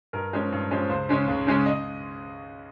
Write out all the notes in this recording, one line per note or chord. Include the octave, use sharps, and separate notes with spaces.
G2 A#4
F3 G#3 C#4
G2
F3 G#3 C#4
C#2 C5
C#3 G#3 C#4
C#2
C#3 G#3 C#4
D#5